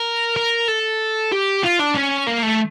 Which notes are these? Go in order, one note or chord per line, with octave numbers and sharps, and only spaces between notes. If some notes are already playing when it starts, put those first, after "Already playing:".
Already playing: A#4
A#4
A4
G4
F4
D4
C#4
A#3
A3